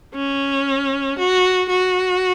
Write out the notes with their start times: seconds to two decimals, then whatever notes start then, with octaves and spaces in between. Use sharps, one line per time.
0.15 C#4
1.18 F#4
1.69 F#4